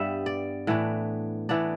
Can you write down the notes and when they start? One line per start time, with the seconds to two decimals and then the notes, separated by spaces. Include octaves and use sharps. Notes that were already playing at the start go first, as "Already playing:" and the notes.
Already playing: G2 G3 B3 E5
0.26 D5
0.67 A2 E3 B3 D4
1.49 A2 E3 B3 D4 D5